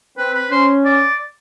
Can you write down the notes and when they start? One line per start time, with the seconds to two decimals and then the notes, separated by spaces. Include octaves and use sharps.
0.18 C4 B4
0.34 B4
0.51 C#4 C5
0.85 D5